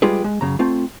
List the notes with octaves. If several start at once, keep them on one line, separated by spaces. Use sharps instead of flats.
G3 G#3 F4 G4 G#4 B4
G#3
F#2 C#3 A#5
A3 C4 F4